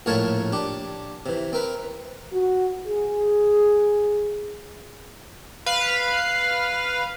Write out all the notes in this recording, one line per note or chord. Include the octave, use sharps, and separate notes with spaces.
A#1 A2 F4 A#4 C#5 A5
D4 G4
C3 E3
C4 A#4 B4
F#4
G#4
B4 F5